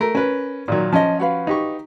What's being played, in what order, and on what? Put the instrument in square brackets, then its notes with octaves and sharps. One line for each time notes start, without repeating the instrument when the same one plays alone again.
[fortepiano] A3 [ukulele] A#4
[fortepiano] C#4 B4
A#2 D#3 F#3
[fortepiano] F3 C#4 F4 [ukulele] D#5 A5
[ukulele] F#4 B4 F5
[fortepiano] D#4 G4 C#6